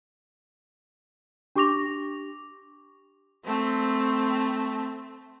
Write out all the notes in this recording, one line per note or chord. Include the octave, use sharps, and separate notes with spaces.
D4 G4 C#6 D6 A#6 F7
A3 C4